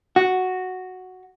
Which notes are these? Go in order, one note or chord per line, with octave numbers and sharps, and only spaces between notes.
F#4